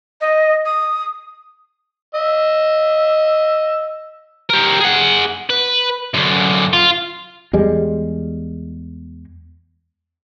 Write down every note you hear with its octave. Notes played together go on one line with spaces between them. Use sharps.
D#5
D#6
D#5 E6
G4 A#4
G#4 F#5
B4
F#2 D3
F4
E2 G3 G#3